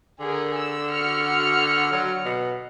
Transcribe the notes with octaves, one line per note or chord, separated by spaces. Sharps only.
D3 G#4 A#4
E6
F#4 F6 C#7
F#3
B2